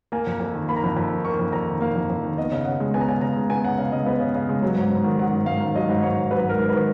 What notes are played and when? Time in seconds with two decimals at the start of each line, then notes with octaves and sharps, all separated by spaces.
0.12 A#3 G#5
0.27 F2
0.40 F2
0.55 D#3
0.68 A#3 B5
0.76 A#5
0.82 F2 B5
0.97 F2
1.11 D#3
1.25 A#3 C#6
1.39 F2
1.53 F2 A#5
1.67 D#3
1.81 A#3 F5
1.95 F2
2.09 F2
2.24 D#3
2.37 B3 D#5
2.52 C#3
2.65 C#3 F#5
2.80 G#3
2.94 B3 G#5
3.00 A#5
3.08 C#3 G#5
3.21 C#3 A#5
3.36 G#3
3.50 B3 G#5
3.64 C#3 F#5
3.78 C#3 F5
3.92 G#3 D#5
4.06 B3 B4
4.20 C#3
4.35 C#3
4.49 G#3
4.62 F#3
4.76 G#2
4.90 G#2
5.04 D#3
5.18 F#3 F#5
5.33 G#2
5.46 G#2 F5
5.60 D#3
5.74 F#3 D#5
5.89 G#2
6.02 G#2 C#5
6.18 D#3
6.31 F#3 B4
6.45 G#2 A#4
6.59 G#2
6.69 D#3 B4